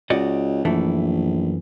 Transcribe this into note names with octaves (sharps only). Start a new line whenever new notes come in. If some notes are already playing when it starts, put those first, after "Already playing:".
C#2 F#4 D5 D#5
A#1 F#2 E3 A3